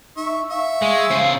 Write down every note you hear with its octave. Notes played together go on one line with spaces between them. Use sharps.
D#4 E5 C#6
E5 F5 C#6
G#3
C#3 C5 F5